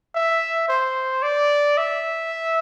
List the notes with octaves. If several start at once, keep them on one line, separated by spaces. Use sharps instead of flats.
E5
C5
D5
E5